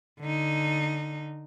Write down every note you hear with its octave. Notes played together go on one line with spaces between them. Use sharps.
D3 D#4